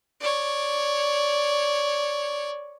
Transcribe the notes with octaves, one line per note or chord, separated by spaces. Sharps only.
C#5 D5